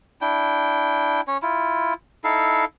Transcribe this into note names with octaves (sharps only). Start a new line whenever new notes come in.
D4 E4 G5
C#4 C#5
E4 F4
D#4 E4 A4 F5